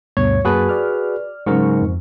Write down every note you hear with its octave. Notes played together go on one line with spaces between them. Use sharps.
D2 G2 B2 C#5
F#2 A#3 F#4 G#4 B4 A5
D5 F6
G#2 C#3 F#3 A#4 C#6
F2